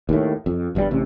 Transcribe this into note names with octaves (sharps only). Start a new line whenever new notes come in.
D#2 A2
F2
G1 G2 A#2 G3
A1 C3